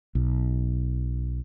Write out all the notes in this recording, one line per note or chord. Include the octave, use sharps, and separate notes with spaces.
B1